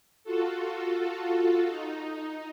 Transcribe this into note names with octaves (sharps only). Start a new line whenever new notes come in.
F4 F#4 A4
D#4